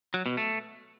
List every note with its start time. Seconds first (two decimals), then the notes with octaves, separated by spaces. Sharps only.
0.14 F#3
0.26 B2
0.37 A3